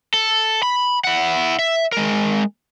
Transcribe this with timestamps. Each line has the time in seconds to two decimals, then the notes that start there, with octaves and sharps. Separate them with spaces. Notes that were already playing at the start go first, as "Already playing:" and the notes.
0.14 A4
0.63 B5
1.04 E4 F#5
1.59 E5
1.92 G#3 A#4